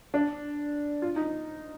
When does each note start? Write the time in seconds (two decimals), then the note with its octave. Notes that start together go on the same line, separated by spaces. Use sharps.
0.14 D4
1.02 F4
1.16 D#4